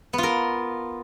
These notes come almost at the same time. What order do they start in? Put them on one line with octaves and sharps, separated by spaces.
B3 F4 A#4